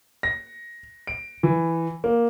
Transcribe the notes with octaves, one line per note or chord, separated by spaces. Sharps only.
A#6
D7
E3
A#3